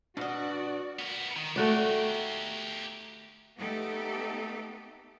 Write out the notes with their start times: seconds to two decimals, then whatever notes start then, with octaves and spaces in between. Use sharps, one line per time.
0.17 B2 D4 F#4 D5 D#5 F6
0.99 B3 A#4
1.37 D#3
1.56 A3 F#4 G4 A#4 D5
3.58 A3 B3 D#4 G4 A4